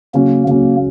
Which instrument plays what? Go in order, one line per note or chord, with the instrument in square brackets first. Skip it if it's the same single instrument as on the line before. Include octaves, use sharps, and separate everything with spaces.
[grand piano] C#3 F#3 C#4 [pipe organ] A#3
[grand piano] C#3 F#3 C#4 [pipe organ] A#3